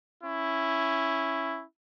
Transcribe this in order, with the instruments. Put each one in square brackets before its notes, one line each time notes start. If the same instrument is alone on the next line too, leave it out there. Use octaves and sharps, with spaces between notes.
[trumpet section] C#4 E4